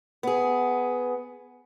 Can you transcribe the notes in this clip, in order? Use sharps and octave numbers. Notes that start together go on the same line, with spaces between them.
B3 G#4